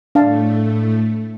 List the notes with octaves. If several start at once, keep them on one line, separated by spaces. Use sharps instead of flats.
A2 A3 D4 F5 A5